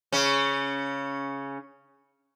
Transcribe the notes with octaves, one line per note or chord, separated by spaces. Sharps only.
C#3 C#4